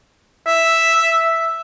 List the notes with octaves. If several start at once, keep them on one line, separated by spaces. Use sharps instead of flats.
E5